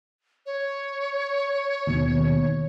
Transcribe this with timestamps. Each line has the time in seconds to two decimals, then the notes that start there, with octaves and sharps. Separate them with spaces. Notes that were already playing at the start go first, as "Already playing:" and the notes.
0.46 C#5
1.87 D#2 B2